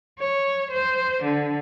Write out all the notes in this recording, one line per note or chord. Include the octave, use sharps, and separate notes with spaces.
C#5
C5
D3